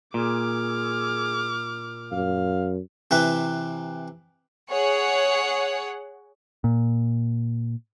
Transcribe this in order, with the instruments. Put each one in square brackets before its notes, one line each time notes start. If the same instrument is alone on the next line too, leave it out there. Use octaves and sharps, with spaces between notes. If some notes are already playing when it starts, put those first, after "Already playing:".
[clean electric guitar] A#2 [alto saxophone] G#4 [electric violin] D6 F6
[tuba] F#2 [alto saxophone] F5
[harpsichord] C3 E3 B4
[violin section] G#4 C#5 F#5
[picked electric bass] A#2